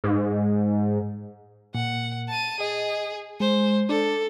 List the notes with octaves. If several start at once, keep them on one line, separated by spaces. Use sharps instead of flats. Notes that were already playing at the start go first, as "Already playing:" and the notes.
G#2
A#2 F#5
A5 D#7
G#4 D#5
G#3 C5
D4 A4